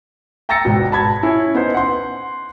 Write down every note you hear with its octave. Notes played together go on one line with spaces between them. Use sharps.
G5 A#5 E6 A6 A#6 C#7
G#1 B2
A5 B5 G#6 A6
C#4 E4
B3 D#4 C5
F#5 C6